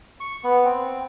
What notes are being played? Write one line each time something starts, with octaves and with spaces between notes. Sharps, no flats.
C#6
B3
C4